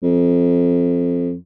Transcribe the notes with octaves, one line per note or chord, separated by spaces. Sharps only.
F2